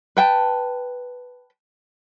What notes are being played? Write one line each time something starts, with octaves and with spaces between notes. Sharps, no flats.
B4 G5 A5